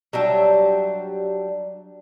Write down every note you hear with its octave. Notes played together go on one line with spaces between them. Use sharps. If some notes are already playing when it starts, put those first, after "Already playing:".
F#3 G3 D4 E5